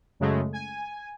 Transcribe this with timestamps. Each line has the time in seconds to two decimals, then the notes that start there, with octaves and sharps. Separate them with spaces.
0.20 F#2 C#3 G#3 A3
0.53 G#5